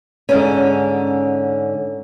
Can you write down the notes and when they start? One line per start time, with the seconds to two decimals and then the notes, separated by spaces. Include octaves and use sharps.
0.29 G#2 D3 C#4